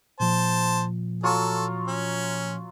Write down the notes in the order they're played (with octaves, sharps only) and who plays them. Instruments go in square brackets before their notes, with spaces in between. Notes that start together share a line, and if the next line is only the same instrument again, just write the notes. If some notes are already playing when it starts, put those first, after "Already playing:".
[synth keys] A#2 F3 [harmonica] C5 A5
[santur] F#3 F4 C#6 [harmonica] A4
[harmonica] C#4